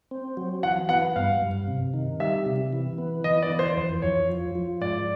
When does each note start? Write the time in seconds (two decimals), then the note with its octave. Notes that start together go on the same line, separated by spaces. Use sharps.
0.11 C4
0.37 F#3
0.63 E3 F#5
0.89 B3 F#5
1.16 G2 F5
1.42 G2
1.68 C3
1.94 D#3
2.20 G3 E5
2.46 C3
2.73 E3
2.98 B3
3.24 E3 D#5
3.42 D5
3.50 E3
3.59 C5
3.77 F2 C5
4.02 F2 C#5
4.29 F3
4.55 F3
4.81 G#2 D5